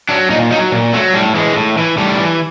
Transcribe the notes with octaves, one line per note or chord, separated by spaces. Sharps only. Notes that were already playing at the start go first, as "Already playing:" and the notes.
F#3 D4
A#2 D#4
F#3 D#4
A#2
F#3 A3
A2 G3
E3 G#3
A2
E3
A2 G3
E3